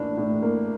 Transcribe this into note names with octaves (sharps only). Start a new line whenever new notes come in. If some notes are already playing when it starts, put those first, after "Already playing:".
Already playing: A2 E3 A#3 D4
A2
A#3